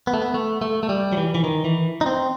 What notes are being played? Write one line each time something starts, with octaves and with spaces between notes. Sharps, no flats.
B3
A3
B3
A3
A3
A3
G3
F#3
E3
E3
D#3
E3
D#4
C4